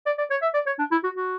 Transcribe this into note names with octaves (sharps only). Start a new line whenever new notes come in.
D5
D5
C#5
E5
D5
C#5
D4
E4
F#4
F#4